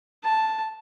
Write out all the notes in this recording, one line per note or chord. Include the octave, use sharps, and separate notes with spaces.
A5